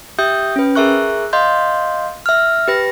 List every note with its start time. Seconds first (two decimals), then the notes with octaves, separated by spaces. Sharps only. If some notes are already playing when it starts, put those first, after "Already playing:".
0.19 G4 E5 D#6 G6
0.56 C#4 B4
0.75 G#4 A#4 E5 C#6 F#6
1.33 D#5 F5 C6 G6
2.26 E5 F6
2.68 G4 B4 A#6